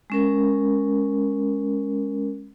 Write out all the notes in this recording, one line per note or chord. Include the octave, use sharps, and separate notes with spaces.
G#3 C#4 A#4